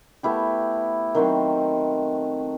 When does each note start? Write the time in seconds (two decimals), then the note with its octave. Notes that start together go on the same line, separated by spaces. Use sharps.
0.23 A3 B3 E4 G4
1.15 D#3 F#3 C4